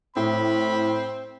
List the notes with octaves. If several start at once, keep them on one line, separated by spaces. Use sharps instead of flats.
A2 C4 B5